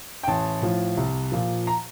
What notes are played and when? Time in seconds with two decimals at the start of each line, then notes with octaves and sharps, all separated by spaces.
0.23 G5
0.27 A1 A5
0.62 A2 F3
0.97 C2
1.32 A#2 F3
1.67 A#5